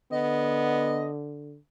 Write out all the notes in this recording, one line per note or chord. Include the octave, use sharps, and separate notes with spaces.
D3 B3 D#5